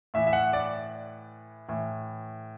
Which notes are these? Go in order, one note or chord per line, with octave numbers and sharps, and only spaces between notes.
A2 E3 E5
E5
F#5
D5
A2 E3